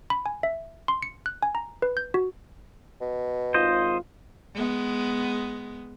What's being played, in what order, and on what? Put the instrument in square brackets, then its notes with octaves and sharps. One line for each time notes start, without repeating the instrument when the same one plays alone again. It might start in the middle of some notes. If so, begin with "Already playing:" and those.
[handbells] B5
G#5
E5
C6
C#7
F#6
G#5
A#5
B4
G6
F#4
[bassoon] B2
[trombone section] G#1 F4 [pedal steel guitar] C5 D#5
[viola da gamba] G#3 B3